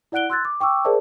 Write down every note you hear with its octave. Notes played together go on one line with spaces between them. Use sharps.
E4 D5 F#5 F#6 D7 G7
C6 E6 F#6 G#6 A6
D6
G5 C#6 D6 E6
G#4 A#4 C5 D5 E5 A5